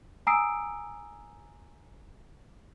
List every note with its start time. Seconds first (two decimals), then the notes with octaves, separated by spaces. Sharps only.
0.27 G#5 A#5 D#6 E6 C7 D7